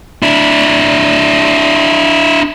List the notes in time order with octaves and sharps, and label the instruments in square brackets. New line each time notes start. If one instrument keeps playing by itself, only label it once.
[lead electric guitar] D4 E4